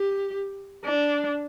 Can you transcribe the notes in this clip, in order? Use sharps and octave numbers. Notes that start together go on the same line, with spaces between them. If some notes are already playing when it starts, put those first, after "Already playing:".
Already playing: G4
D4